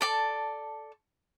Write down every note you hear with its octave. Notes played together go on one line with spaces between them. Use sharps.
A4 D5 A5